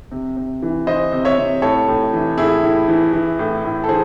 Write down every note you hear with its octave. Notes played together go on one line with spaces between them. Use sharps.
C3
C3
E3
E3 C5 D#5
C3
C#5 E5
C3
A2 A4 C#5
A2
E3
A2 E4 G#4
A2
E3
E3
A2
A2
A4
E3 G#4 C5